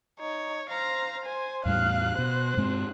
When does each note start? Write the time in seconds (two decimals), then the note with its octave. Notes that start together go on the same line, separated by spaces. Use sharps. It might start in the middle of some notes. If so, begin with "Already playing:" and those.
0.20 D#4 C#5
0.70 C5 F5 A#5
1.25 C5 G#5
1.66 E2 A2 G3 F5 F#6
2.19 B2 C5
2.57 G2 G#3 C4